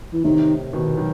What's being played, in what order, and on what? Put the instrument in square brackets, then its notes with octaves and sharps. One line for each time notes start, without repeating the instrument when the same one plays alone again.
[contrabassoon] E3
[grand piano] A2 C3 [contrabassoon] D#3
[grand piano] B2 D#3
D#3 F#3